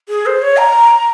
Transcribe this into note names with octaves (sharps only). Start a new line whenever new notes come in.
G#4
C5
C#5
A#5